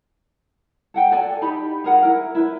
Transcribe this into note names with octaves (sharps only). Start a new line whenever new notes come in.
A4 F#5 G5
A4 D5 G#5
D#4 G4 B5
G#4 A#4 F#5
E4 A#4
E4 B4